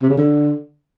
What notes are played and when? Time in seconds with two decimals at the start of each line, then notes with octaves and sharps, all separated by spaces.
0.02 C3
0.10 C#3
0.17 D3